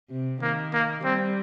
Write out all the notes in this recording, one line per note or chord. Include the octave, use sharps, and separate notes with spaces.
C3
D#3 A#3
A#3
G3 C4